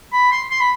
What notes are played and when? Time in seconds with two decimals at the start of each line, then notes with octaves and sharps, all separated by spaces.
0.12 B5
0.31 C6
0.51 C6
0.60 B5